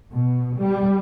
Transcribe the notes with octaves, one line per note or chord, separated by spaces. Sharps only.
B2
G3